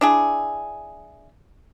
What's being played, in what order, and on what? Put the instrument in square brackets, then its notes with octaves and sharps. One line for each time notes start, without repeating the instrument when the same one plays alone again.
[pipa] D4 E4 G#4